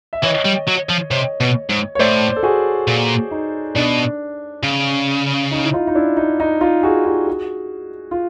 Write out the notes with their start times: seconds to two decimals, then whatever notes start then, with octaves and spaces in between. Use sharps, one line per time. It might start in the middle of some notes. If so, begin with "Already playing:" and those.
0.13 E5
0.23 E3 C#5 D#5
0.45 G3
0.68 F#3
0.89 F3
1.11 C3 C#5 D#5
1.41 B2
1.69 G#2
1.95 C#5
1.99 A2 C5 D5
2.36 A4
2.43 F#4 G#4
2.87 A#2
3.31 D#4
3.75 B2 D4
4.63 C#3
5.51 D#4
5.64 E4
5.73 D#4 F4
5.87 D#4
5.95 D4 E4
6.17 D#4
6.40 D#4
6.61 D#4 F4
6.83 F#4 G#4
7.06 F4 G4
7.27 F#4 G#4
8.11 F4